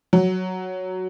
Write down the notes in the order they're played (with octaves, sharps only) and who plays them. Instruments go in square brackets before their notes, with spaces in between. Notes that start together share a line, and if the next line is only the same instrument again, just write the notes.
[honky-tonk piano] F#3